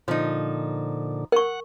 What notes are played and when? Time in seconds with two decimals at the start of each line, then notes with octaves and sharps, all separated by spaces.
0.08 A#2 D3 F3 D#4
1.32 A#4 F#5 C#6